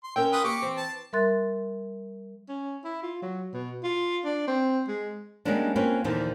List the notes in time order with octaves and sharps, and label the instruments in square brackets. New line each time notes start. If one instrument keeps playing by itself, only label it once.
[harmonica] C6
[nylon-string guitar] C#4 A#4 C#5 [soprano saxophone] G5 [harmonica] E6
[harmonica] F4 B4 D#6
[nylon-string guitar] A#3 [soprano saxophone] G4 [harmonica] C#6 D6
[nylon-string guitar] E3 [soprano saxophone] C4
[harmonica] A5
[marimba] G3 A#4 E5 C6 F#6 A6
[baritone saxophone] C#4
E4
F4
F#3
B2
F4
D4
C4
G#3
[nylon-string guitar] G3 G#3 A#3 B3 C#4 D4
A#3 C4 C#4 F4 B4
D#2 A#2 D3 E3 F3 D#4